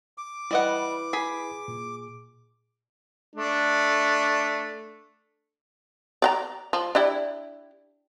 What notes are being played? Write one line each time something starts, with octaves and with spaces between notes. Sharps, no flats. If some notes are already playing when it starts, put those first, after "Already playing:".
D6
G3 E4 B4 D#5 F#5
G#4 B5
A#2
A3 D4
D5 F#5 A#5
F3
D4 E4 G4